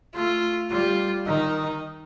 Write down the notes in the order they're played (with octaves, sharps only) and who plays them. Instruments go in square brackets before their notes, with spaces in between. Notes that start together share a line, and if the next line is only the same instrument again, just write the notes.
[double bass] A3 [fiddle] F4
[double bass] G3 [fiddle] F4
[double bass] D#3 [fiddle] D#4